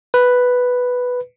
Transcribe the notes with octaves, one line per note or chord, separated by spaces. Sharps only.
B4